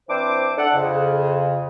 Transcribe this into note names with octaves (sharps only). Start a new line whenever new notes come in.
E3 C4 D4 C5 D6
D4 A4 D5 F#5
F2 C#3